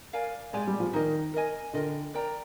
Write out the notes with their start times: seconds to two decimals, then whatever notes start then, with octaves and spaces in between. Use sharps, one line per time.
0.13 A#4 D5 F5 G#5
0.53 G#3 G4 D5 G#5
0.68 G3
0.80 F3
0.93 D#3 D#4 A#4 D#5
1.34 A#4 D#5 G#5
1.73 D3 F4 A#4 D#5 G5
2.14 A#4 D5 G5 A#5